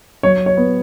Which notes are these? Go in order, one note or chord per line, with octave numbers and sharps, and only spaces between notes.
F#3 C#5
C#5
B3